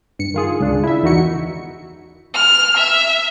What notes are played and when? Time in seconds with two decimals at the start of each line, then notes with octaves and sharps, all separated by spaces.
0.19 G2 C#7
0.34 D#3 F4 G#4
0.60 C#2 C#3 D4
0.84 E4 E5
1.03 E2 D#3 D#4 F#4 C#7
2.34 F6
2.77 E5